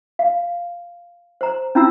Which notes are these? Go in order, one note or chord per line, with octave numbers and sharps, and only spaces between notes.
F5
C5 A#5
C#4 D4 E4 F4 A#5 E6